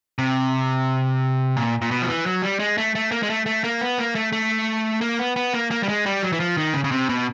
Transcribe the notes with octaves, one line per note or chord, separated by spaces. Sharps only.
C3
A#2
A#2
B2
F3
E3
F#3
G3
G#3
A3
A3
A#3
G#3
A3
A3
A#3
B3
A#3
A3
A3
A#3
B3
B3
A#3
A#3
G3
G#3
G3
F#3
E3
F3
D#3
C#3
C#3
C3
B2